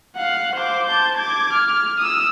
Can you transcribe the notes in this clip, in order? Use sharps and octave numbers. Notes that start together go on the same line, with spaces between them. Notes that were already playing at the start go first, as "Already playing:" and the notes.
F5 F#5
C5 D6
A5 G6
D6 G#6
F6
D#6 E6